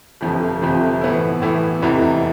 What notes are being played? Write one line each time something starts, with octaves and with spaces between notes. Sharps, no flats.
G1 F2 C3 F3
G1 F2 C3 F3
A2 E3 B3 E4
A2 E3 B3 E4
F1 E2 C3 E3